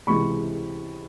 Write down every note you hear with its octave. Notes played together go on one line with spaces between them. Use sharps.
C#2 C3 E3 G#3 B5 C#6